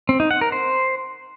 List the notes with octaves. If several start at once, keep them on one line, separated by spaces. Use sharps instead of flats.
C4
D#4
F#5
A#4
C5